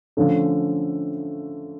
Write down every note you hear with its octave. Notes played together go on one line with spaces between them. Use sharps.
D3 F3 A3 C#4